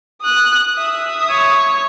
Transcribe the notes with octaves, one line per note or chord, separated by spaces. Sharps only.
D#6 F#6
E5 D#6
C#5